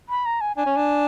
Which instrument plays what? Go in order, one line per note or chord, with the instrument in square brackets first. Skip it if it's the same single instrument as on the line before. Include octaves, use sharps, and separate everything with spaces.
[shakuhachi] B5
A#5
G#5
[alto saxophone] D4 [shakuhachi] G#5
[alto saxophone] C#4
D4